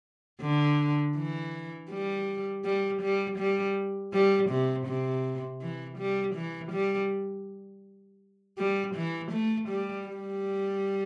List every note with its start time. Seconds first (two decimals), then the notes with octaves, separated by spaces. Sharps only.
0.41 D3
1.16 E3
1.91 G3
2.64 G3
3.02 G3
3.38 G3
4.13 G3
4.50 C3
4.87 C3
5.61 E3
5.98 G3
6.35 E3
6.72 G3
8.58 G3
8.95 E3
9.32 A3
9.68 G3
10.07 G3